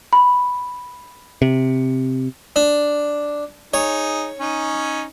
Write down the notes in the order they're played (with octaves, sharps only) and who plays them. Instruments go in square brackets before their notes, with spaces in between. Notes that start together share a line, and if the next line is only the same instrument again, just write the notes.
[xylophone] B5
[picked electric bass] C3
[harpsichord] D4
[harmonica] D#4 G#4 [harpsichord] C#5
[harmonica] C#4 D#4